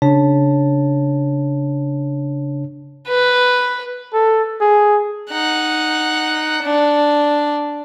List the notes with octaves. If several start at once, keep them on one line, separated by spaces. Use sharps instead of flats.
C#3 D4 C#5 A5
B4
A4
G#4
D#4 F#5
D4